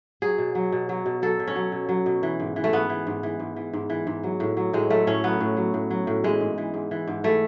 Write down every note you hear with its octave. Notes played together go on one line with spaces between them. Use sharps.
F#3 G#4
B2
F#3
B2
F#3
B2
F#3 A4
B2
C#4
F#3
B2
F#3
B2
E3
G#2
E3
A3
G#2 B3
E3
G#2
E3
G#2
E3
G#2
E3
G#2
F#3
A2
F#3
A2 G#3
F#3 A3
A2 C#4
F#3 B3
A2
F#3
A2
F#3
A2
E3 G#3
G#2
E3
G#2
E3
G#2
E3 A3